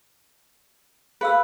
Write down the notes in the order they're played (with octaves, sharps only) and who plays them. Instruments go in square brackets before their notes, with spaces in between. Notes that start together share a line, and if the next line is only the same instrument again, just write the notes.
[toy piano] G#4 F5 E6 [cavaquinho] B4